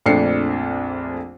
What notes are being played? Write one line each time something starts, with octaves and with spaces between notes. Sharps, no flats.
A#1 F2 A3 D4 C7 C#7